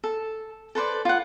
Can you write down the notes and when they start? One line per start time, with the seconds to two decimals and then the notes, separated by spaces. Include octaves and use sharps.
0.04 A4
0.75 A4 B4 C5 D5
1.05 F4 F#5